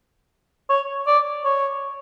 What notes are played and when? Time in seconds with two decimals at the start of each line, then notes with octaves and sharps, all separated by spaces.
0.70 C#5
1.07 D5
1.44 C#5